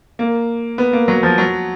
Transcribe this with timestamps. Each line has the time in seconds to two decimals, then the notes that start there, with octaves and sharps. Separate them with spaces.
0.19 A#3
0.78 B3
0.93 A#3
1.08 F#3
1.23 F3
1.38 F#3